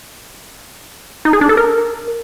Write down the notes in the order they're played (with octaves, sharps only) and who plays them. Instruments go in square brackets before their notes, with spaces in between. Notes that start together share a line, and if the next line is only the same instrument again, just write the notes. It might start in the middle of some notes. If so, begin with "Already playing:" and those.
[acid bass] D#4
G#4
D4
A4
A#4